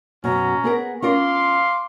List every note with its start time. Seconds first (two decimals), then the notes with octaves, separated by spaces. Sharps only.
0.24 F#2 B2 C#4 A#5
0.64 B3 G#4 A#4
1.02 C#4 F4 A#4 F5 C6 D6